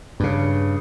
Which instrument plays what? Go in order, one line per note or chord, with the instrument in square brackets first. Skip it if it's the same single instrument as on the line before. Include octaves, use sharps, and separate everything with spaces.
[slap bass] G2 C#3